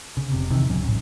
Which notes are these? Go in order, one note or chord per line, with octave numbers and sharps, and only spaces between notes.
C#3
F1 C3
C3 D#3 E3
D1 F#3 C#4
A1 G#2